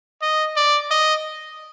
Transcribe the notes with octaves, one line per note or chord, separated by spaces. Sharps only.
D#5
D5
D#5